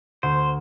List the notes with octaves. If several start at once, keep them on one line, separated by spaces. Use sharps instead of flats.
D2 C5